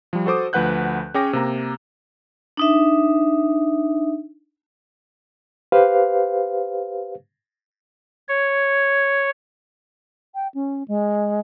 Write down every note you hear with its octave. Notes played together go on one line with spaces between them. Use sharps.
F3 G3
F#4 A4 C5 D6 D#6
D2 F3 B4 F#5 F#6 G6
C#4 G#4 C#5 G5 D6 A#6
C3 A#3 A#5
D4 D#4 E5
G4 B4 C5 F5
C#5
G5
C#4
G#3